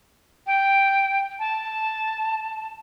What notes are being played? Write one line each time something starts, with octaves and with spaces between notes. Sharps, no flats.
G5
A5